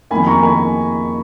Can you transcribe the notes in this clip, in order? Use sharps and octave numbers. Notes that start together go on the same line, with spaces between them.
F2 D#3 A#3 G#5 B5
A#5 C#6
D#3 A#3 G#5 B5